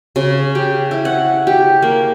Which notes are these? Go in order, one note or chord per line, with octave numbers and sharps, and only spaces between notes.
C#3
G4
E4
F#5
G4
A#3